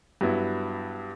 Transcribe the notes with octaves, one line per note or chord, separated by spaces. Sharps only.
G2 F#3 B3 E4